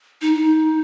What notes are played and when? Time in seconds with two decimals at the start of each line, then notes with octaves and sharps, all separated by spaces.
0.21 D#4
0.35 D#4